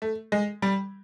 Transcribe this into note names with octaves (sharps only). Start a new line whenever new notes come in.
A3
G#3
G3